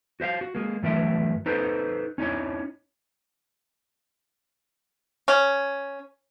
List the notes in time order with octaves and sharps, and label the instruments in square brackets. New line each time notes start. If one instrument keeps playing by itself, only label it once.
[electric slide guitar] F#4 C5 E5 F5
F#4
G#3 A#3
G2 E3 F#3 A3 A#4 E5
D#4 A4 B4 C5
C#4 D#4 E4 C#5
[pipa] C#4